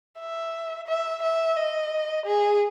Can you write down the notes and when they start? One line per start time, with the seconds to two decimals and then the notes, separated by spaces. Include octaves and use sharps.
0.19 E5
0.87 E5
1.23 E5
1.57 D#5
2.26 G#4